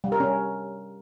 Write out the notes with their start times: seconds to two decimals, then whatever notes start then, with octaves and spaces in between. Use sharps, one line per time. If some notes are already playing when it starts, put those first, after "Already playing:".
0.04 G3
0.12 A#4
0.20 C#4